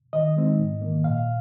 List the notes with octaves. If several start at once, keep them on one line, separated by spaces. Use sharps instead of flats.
D#3 D#5
G#3 C4 D#4
G#2
D#3 A#3
A#2 F5